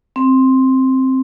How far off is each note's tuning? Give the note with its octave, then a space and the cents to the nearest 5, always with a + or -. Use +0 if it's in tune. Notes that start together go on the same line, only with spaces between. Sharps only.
C4 +5